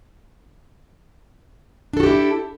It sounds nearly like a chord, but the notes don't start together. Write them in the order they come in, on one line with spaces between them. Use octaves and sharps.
D4 A4 F#4 G4 E4